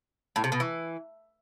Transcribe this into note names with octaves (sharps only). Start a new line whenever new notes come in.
A2
C3
B2
E3